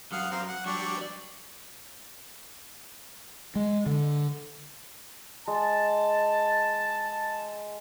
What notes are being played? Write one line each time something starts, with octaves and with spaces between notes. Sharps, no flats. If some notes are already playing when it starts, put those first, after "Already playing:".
G2 F#3 F5 F#5 D#6
C4 F5 A#5
F#5
F#3 G3 D4 G4 C#6
B4 D5
G#3
D3
G#3 A5